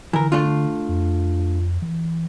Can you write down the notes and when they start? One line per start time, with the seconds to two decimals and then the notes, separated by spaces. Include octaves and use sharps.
0.13 D3 E3 A#4
0.32 A3 D4 F4
0.89 F2
1.82 E3